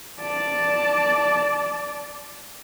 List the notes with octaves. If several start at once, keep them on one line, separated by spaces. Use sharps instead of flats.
D5 A5